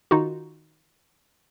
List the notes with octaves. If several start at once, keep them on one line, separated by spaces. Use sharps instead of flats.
D#3 D#4 F4 F#4